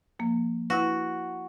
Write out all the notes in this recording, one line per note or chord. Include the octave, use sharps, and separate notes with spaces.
F3 A#3
E4 F#4 B4